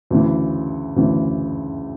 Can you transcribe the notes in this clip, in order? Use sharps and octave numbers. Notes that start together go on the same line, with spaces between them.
D2 C#3 E3
D2 C#3 E3